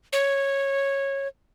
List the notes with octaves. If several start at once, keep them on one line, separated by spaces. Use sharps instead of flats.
C#5